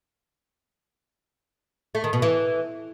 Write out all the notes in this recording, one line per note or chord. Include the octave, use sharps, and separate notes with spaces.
A3
D#3
B2
E3